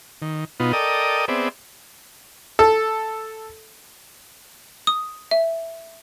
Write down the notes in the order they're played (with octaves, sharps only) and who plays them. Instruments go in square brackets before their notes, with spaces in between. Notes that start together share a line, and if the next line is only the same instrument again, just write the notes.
[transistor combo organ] D#3
B2 B3 D#4 F4
A4 A#4 D5 D#5 G5 D#6
B3 C4 G#4 D5 E5
[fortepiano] A4
[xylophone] D#6
E5